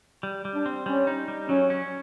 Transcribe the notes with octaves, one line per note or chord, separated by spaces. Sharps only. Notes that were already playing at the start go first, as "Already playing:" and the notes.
G3
G3
D4
C4
G3 C#4
D#4
G3
F#3 C#4
C#4